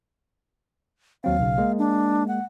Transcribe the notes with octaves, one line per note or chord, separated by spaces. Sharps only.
D#2 F#3 C4 F5
B1 C#3
G#3 A#3
D4
F#5